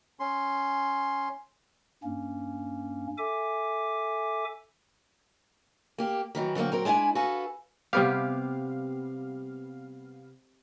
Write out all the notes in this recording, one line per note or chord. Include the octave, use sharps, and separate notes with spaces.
C#4 C6
G2 A#3 C#4
A4 E5 G#5 D6
A#3 G4
D#3 E3 F#3
D3 F#3 G3 A#3 C4
F#3 C4 A#4
G#3 D4 E4 F5 G#5
F#4 A4 B4 F5 G#5
C3 G3 B3 G4 F5